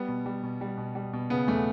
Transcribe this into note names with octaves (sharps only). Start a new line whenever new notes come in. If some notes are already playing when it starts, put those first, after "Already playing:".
Already playing: G3 B3
B2
G3
B2
G3
B2
G3
B2
C#3 B3
E2 A3